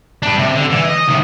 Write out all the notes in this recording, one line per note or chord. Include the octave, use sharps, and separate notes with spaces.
D4 B4
C3
D3
E3
D#5
C3 D#3